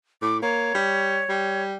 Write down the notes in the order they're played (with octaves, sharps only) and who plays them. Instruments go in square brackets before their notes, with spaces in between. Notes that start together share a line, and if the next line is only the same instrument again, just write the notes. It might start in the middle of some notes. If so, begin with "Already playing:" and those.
[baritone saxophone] A2 [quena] D6
[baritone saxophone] A#3 [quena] C#5
[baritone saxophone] G3
G3